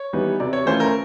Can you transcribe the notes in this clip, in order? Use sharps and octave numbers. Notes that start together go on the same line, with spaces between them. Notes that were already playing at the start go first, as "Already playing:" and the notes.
Already playing: C#5
E3 G3 B3 D#4
C3 D5
C#5
E3 A3 C#4 F4 C5
A#4